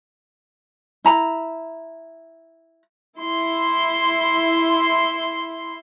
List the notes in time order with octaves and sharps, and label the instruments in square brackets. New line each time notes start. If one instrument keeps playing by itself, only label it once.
[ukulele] E4 A#5 B5
[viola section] E4 C6